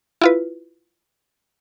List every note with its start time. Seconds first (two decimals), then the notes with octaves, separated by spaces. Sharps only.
0.21 E4 F4 B4